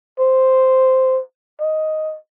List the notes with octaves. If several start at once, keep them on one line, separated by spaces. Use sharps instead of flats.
C5
D#5